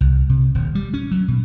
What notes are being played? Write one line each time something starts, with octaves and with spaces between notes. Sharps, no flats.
C2
C3
D#1
G3
C#4
F#3
B2